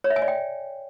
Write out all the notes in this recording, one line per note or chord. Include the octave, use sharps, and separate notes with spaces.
C#5
E5
G#5
D5
G5